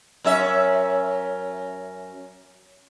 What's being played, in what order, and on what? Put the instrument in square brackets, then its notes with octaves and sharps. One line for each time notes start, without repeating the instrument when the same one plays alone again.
[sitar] F#2 C#4 E5